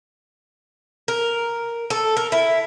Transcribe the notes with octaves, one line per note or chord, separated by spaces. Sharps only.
A#4
A4
A#4
E4